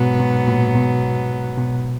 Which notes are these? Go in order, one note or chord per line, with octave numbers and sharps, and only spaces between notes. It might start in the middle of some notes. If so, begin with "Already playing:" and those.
Already playing: G#2 B2 F#3 B3
B2
A#2
B2
B2